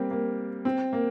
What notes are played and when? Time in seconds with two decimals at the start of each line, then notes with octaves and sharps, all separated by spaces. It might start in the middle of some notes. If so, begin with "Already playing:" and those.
Already playing: G3 A#3 C4
0.11 A#3
0.65 C4
0.93 A#3